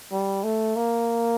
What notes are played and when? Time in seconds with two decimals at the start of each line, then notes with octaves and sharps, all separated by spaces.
0.12 G3
0.44 A3
0.76 A#3